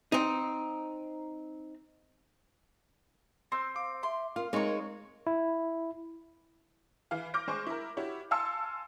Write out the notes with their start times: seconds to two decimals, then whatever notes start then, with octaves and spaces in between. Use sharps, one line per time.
0.12 C4 D#4
3.52 C4 C6 E6 G6
3.76 F5 D6
4.03 E5 C6
4.36 F4 A#4 F5
4.53 G#3 C4 D#4 A#4 C#5 C#6
5.27 E4
7.11 E3 F5
7.34 D6 F6 G6 A#6 D7
7.48 G#3 C5 G#5 C#6
7.67 E4 A#4
7.97 E4 F#4 G4 C#5
8.31 F5 G#5 A5 C6 E6 C#7